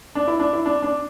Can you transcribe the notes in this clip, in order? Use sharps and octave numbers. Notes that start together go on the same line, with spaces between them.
D4
E4
D4
E4
D4
D4